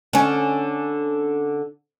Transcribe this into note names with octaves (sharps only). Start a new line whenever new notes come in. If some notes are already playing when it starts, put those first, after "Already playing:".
D3 C#4